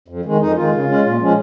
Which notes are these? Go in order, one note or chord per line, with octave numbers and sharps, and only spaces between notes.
F2
D#3 G#3
F2 D#4
D#3 G#3 F4
C#3
G#3 C#4
A#2
F3 G#3 C#4